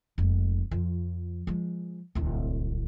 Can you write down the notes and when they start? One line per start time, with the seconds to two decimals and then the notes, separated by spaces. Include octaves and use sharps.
0.18 F1 G#3
0.71 F2 F3
1.47 F3 G#3
2.15 D1 C2